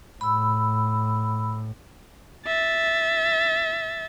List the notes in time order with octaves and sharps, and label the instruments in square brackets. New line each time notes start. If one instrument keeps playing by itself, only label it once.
[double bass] A2 [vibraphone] B5 E6
[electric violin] E5 A6